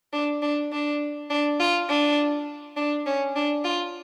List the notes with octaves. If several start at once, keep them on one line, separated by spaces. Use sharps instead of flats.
D4
D4
D4
D4
F4
D4
D4
C#4
D4
F4